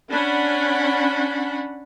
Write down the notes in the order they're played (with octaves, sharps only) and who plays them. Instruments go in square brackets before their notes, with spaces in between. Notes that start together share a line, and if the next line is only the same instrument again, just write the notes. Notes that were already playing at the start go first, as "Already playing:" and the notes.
[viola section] C#4 D4 F#5 B5